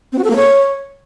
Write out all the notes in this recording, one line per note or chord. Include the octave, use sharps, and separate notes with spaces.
C4
F#4
A4
A#3
C#5